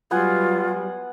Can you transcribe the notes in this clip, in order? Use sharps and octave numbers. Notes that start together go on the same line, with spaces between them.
F#3 G3 B3 F4 F#5 G#5